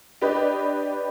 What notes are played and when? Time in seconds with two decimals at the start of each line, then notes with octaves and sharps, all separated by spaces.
0.22 D4 G4 B4 D#5